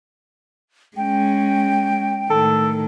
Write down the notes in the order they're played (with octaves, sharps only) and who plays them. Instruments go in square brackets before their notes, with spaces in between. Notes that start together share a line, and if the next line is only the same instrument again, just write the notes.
[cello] G#3 C#4 [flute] G5
[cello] A2 D#3 [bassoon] A4